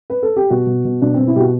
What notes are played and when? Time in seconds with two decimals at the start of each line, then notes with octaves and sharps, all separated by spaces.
0.10 B4
0.23 A4
0.36 G4
0.51 B2 F#4
0.67 B2
0.85 B2
1.02 B2 D4
1.14 B2 C4
1.28 E4
1.36 B2 F#4 G4